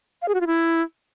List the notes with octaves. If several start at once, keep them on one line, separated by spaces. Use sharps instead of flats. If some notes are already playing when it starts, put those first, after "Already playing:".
F5
G#4
F#4
F4
E4